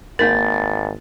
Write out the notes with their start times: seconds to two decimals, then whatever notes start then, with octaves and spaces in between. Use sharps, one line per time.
0.19 G#1 A#3 D#4 A#4 A6